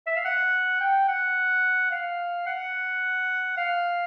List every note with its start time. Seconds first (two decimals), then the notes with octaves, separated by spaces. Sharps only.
0.06 E5
0.16 F5
0.25 F#5
0.80 G5
1.08 F#5
1.91 F5
2.46 F#5
3.57 F5